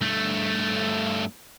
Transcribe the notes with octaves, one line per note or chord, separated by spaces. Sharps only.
G2 A3